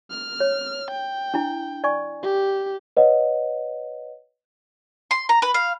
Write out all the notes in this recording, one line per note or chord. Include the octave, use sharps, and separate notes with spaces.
F6
C#5
G5
D4 E4
D5 G#5 C#6
G4
B4 C#5 D#5 F#5
C6
A#5
B4
F5